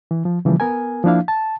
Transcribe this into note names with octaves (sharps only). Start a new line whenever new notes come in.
E3
F3
C#3 E3 F3 G3 A#3
B3 A#4 G#5
F3 A#3 D4 E4 F5
A5